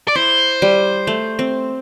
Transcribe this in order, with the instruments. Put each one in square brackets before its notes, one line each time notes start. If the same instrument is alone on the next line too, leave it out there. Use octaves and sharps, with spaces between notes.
[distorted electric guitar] D5
[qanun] E4 [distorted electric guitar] C5
[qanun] G3
A3
C4